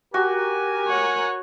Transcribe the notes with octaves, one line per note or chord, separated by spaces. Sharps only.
F#4 G4 A#4 G#5
C#5 F#5